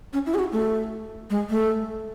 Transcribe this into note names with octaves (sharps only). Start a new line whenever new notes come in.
C#4
E4
G#4
F#4
A3
G#3
A3